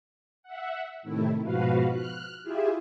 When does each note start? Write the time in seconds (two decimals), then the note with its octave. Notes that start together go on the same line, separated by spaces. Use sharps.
0.43 E5 F#5
1.02 A2 C3 D#3 A3 E4
1.43 G#2 B2 F3 F#4 B4 F5
1.89 F6 F#6
2.43 E4 F4 G4 G#4 E5